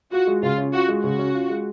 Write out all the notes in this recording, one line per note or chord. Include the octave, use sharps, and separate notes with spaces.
F4 F#4
G#3
C#3 F4
C#4
F4 F#4
G#3
C#3 F#4
C#4
F4
G#3